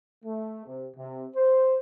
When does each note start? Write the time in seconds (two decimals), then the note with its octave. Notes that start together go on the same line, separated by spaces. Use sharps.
0.24 A3
0.66 C3
0.97 C3
1.35 C5